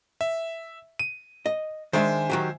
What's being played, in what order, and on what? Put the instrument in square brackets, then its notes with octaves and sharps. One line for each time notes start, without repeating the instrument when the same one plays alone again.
[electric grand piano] E5
D#7
[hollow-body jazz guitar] D#5
[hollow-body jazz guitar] D#3 G#3 D4 [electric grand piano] C5 E5 G#5
[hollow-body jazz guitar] D#3 F#3 G4